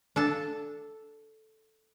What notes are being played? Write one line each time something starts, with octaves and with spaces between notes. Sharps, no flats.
D4 A4 A5